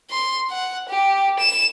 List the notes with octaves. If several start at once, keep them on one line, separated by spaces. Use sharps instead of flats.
C6
F#5
G4
E7